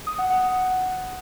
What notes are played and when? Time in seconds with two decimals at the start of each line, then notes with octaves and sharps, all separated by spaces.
0.07 D#6
0.18 F#5
0.30 F#5